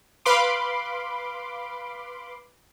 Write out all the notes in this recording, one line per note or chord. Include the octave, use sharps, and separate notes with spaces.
B4 F5 B5 C6 D6